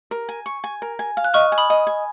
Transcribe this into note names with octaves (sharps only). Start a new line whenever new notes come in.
A#4
G#5
C#6
G#5
A#4
G#5
F5
F#6
D#5 C#6 F6
G#5
B5 D#6
D#5
G#5